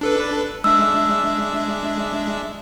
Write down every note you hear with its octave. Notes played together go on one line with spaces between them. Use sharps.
D4 A4 B4
G#3 D4 E5 E6